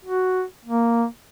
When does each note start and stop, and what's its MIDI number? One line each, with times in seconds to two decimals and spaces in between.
0.05 0.42 66
0.65 1.05 58